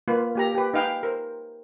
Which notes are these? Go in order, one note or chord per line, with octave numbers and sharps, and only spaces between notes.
A#3 F4 B4
A#3 G4 A#5
G4 B4
D#4 B4 F5 G5 G#5
A#4 C5